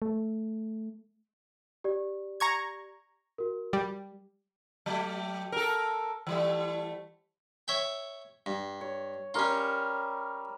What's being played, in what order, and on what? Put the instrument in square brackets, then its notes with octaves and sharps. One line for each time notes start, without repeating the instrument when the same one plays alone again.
[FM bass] A3
[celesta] G4 D5
[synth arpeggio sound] A#5 C#6 G#6
[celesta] F#4 A#4
[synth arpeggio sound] G3
[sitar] F#3 A3 G4
A4 A#4
E3 G3 A3
[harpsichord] C#5 E5 G5
G2
[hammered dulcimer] C#5
[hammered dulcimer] G3 A#4 C#6 [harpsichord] C#4 F4